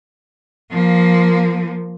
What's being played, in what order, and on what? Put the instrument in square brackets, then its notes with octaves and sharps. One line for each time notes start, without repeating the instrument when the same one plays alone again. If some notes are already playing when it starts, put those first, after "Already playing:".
[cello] F3 A#3